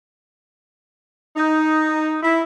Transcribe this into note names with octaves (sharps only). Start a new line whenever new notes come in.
D#4
E4